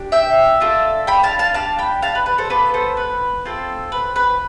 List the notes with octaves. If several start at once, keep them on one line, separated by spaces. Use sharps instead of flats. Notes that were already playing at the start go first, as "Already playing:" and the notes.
Already playing: D4 G4
E5 G5
D4 F4 A4
G5 B5
F5 A5
F5 A5
D4 G4 F5 A5
G5 B5
F5 A5
B4
B4
A4 C5
B3 F4 A4 B4 D5
A4 C5
B4
C4 F4 A4
B4
B4